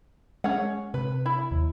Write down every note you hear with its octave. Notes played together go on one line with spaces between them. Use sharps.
G#3 C#4 F#5
C3 B4
E4
D#2